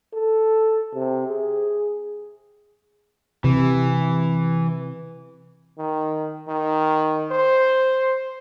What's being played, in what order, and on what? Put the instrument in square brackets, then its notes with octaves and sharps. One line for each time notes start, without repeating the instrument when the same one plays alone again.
[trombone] A4
C3
G#4
[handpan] C3 [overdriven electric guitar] E3
[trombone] D#3
D#3
C5